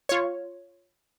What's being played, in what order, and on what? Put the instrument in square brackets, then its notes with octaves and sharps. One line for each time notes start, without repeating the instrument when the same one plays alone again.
[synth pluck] F4 C#5